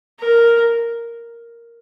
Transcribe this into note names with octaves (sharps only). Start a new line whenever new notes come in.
A#4